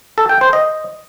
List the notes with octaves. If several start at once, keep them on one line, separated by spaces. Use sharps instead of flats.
A4
G5
C5
D#5